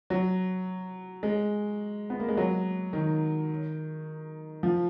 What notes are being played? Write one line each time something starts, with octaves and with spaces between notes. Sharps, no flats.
F#3
G#3
B3
A#3
G#3
F#3
D#3
F3